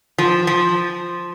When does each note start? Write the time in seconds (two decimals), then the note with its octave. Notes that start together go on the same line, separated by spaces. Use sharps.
0.18 F3
0.47 F3